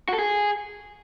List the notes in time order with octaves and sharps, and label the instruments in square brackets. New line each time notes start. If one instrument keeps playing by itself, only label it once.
[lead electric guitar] F#4
A4
G#4